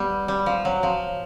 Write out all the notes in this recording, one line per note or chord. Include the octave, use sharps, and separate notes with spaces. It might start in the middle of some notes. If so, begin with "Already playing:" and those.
Already playing: G3 B3
G3
F3
F#3
F3